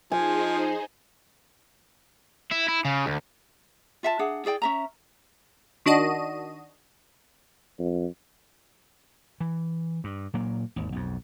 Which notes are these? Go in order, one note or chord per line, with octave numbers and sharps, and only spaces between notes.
F3 D#4 G#4 C5 G#5
E4
E4
C#3
D2
F4 E5 F#5 A5
D4 G#4 F#5
E4 G#4 D5 G5
C#4 E5 A#5
D#3 D4 F#4 D#5 D#7
F2
E3
G2
A#2 F#3 A#3
G#1 D#2
B1 F2